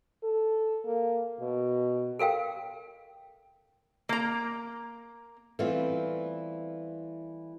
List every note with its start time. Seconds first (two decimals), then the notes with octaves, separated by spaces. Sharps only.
0.23 A4
0.85 A#3
1.40 B2
2.19 A4 A#4 F5 G5
4.09 A#3 A#5
5.59 E3 G3 A3 B3 C4 F4